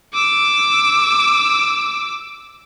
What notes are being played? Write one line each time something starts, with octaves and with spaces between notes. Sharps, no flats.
D6 E6